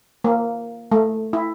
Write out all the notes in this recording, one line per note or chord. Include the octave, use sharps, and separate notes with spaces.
A#3
A3
E4